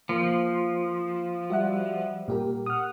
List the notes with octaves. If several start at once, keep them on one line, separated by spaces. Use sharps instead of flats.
F3 A#3
G3 F#4 E5 F#5
A#2 G4 A#4
F#5 D#6 F6